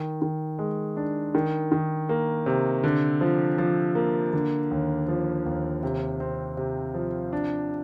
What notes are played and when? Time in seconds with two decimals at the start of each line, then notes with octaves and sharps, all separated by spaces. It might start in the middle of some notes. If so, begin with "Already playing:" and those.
Already playing: D#3
0.22 D#3
0.59 G#3
0.97 D4
1.35 D#3
1.72 D#3
2.09 A#3
2.46 C3
2.84 D3
3.21 F3
3.58 F3
3.95 A#3
4.33 D3
4.71 D#2
5.08 F3
5.46 D#2
5.83 C3
6.20 C4
6.57 C3
6.94 F3
7.33 D4